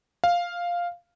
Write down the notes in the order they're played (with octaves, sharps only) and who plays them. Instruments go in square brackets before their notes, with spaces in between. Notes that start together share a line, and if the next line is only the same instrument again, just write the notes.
[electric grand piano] F5